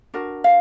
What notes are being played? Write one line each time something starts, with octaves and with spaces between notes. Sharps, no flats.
D4 F#4 A#4
F5